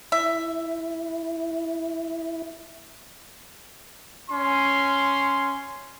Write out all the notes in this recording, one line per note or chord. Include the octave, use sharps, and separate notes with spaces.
E4 E5
C#4 C6